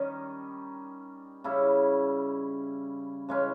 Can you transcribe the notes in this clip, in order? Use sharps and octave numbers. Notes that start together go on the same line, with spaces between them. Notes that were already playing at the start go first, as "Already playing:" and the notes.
Already playing: D#3 G3 C#4
C#3 G3 C#4 E4
C#3 E3 G#3 C#4